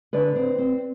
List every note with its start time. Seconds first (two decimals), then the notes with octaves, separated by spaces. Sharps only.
0.13 D3 B4 D5
0.35 C4
0.58 C4